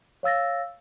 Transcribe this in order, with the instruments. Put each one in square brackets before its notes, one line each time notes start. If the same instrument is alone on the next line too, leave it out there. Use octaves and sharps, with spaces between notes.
[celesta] C#5 F5 E6 A6 A#6